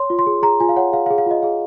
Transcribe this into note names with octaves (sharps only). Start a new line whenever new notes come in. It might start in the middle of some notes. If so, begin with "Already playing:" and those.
Already playing: C#5 C6
F4
C6
G#4
G#4 A#5
F4 G#5
F5
C#5 F#5
G#4 F5
F5
G#4
F5
F4 D#5
G#4 F5